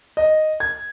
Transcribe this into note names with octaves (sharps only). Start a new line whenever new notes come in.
D#5
G#6